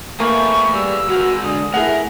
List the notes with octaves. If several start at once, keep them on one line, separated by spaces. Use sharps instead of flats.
A3 A#3 G#4 B4 C#6
G3 E6
G#3 F#4 A#4
D3 D#6
A3 E4 G#4 A#4 F#5